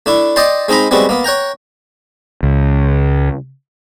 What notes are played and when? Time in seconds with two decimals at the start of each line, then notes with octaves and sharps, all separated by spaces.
0.06 A3 D4 E4
0.36 D5 D#5 G5 A5 C6
0.68 G#3 C4 D#4 A#5 B5
0.91 G3 G#3 B3 C4 F#4
1.09 A#3 B3
1.24 C#5 F#5 G5 A#5
2.43 C#2